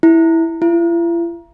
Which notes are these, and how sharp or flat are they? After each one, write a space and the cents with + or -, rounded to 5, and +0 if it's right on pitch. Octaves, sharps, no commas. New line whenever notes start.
E4 -5
E4 +45